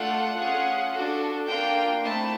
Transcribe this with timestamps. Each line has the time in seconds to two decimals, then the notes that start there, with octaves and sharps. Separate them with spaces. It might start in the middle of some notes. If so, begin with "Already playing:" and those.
Already playing: A3 D4 F4 A4 F#5
0.36 C#4 F4 G#4
0.92 D4 F#4 A4
1.47 A#3 D4 F4 G5
2.03 A3 C4 E4 A5